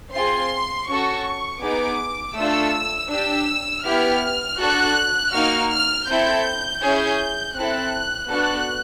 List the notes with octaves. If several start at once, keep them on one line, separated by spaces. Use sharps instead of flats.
C4 F4 G#4 C6
C#4 F#4 A4 C#6
B3 D#4 G#4 D6
A3 D4 F4 A4 E6
D4 G4 E6
B3 E4 G4 F6
D4 F#4 A4 F#6
A#3 D#4 F#4 F6
F6
C4 E4 A4 G6
C#4 E4 G#4 G6
C4 E4 A4 F#6
B3 D4 F#4 A4 F#6